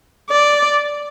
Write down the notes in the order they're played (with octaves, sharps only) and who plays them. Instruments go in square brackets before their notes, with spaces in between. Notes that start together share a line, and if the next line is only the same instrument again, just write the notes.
[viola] D5